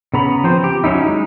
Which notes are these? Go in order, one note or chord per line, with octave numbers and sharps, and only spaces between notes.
C#3 B3 A#5 B5
F3 C4 C5
G4
F#3 C#4 D#4 E4
G#3 D#4